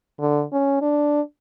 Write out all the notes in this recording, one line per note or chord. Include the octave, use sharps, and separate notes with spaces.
D3
C#4
D4